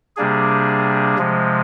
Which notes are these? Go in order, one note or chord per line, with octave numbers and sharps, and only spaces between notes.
C3 G3 A#3 D4 G#4
C3 F3 G#3